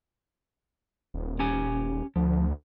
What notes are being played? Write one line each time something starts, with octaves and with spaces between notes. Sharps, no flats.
D#1
C#4 G4 G#5
D2 F3